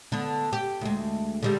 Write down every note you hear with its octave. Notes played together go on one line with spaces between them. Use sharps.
D3 B3
G4
D2 G#3
D3 G3 G#3